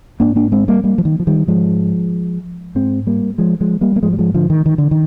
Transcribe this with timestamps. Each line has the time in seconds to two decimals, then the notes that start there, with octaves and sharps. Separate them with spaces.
0.20 G#2 A#3 D4
0.36 A#3 D4
0.52 G#3 C4
0.68 G3 A#3
0.84 G3 A#3
0.98 F3
1.05 D#3
1.20 F3
1.27 D#3 G3
1.47 G#2 F3 G#3
2.75 G#2 G#3 C4
3.07 G3 A#3
3.38 F3 G#3
3.61 F3 G#3
3.81 G3 A#3
3.96 A#3
4.02 G#2 F3 G#3
4.13 G3
4.18 F3 G#3
4.34 D3 F3
4.50 D#3
4.66 D#3
4.78 D3
4.91 D#3